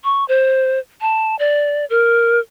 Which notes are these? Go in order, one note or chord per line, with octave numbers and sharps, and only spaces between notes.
C#6
C5
A5
D5
A#4